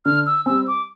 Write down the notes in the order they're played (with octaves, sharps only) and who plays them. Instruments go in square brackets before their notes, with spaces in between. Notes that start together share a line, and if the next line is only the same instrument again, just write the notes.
[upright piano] D3 [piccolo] F6
[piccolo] E6
[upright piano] G3 C4 [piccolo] E6
[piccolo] D6